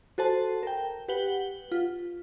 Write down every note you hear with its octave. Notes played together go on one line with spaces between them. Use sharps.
F#4 A4 C5 A5
A#4 G5
G4 B4 F#5 F#7 G7
F4